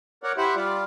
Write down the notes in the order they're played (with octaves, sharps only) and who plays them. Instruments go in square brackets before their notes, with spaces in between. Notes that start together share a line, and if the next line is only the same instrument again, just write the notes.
[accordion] A#4 C#5 D5 F#5
E4 G4 C5 E5 F#5
G3 F4 D5